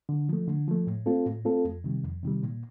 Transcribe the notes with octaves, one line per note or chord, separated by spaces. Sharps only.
D3
F3 A3
D3
F3 A3
A2
A3 C4 F4 A4
A2
A3 C4 F4 A4
F2
C3 D#3 G3
F2
C3 D#3 G3
A#2